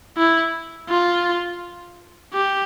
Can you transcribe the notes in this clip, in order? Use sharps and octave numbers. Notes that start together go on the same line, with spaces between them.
E4
F4
G4